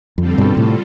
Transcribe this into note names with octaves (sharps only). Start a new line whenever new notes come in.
F2 D3 G3 C4 F4 A4
G2 B2
A2 C3